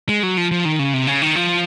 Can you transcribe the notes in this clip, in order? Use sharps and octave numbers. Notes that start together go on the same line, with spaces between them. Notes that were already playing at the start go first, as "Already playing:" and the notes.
G#3
F#3
F3
F3
D#3
C#3
C3
C#3
D#3
F3